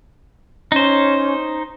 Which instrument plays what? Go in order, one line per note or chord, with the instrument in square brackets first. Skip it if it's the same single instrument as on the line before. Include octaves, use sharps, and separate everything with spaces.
[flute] C#4 [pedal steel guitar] D#4 C5